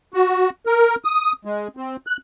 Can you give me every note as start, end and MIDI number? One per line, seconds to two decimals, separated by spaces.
0.14 0.50 66
0.66 0.95 70
1.05 1.32 87
1.45 1.68 56
1.77 1.96 60
2.07 2.17 90